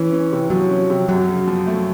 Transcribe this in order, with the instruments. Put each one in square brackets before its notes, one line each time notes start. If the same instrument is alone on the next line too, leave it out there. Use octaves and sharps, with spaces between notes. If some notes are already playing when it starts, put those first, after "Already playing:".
Already playing: [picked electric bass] E3 [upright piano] C#4
[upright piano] C#4
C3
[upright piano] F3 [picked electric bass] F#3
[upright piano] C#4
C3
[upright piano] F#2 [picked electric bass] F#3
[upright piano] C#3
F3
A3